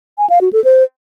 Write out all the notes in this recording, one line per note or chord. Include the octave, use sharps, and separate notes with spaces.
G#5
F5
F#4
A4
C5